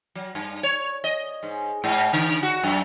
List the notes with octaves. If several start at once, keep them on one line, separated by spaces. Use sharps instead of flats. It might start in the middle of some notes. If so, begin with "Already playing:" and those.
F#3
G2
C#5
D#5
G#2
G#2
D3
F#4
F#2